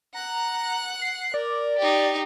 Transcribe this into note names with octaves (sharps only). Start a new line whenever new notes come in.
F#5 A#5 F#6
C7
A#4 D5
D#4 G4